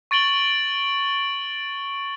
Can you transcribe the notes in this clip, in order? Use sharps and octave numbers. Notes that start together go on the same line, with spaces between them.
C#6 A6 D7 F#7 G7